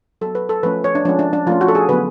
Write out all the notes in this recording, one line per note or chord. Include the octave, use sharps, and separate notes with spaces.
F#3 B3 A4
B4
A4
F3 A3 C#4 B4
C#5
D4
F3 G#3 C#4 D4
D4
D4
F3 A3 C#4 F4
F#4
A4
G#4
D3 F#3 B3 B4